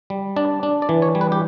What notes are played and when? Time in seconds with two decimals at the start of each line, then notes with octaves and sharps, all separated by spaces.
0.10 G3
0.36 D4 D5
0.63 D4
0.82 D5
0.89 E3
1.02 C#5
1.15 G3
1.21 B4
1.32 G4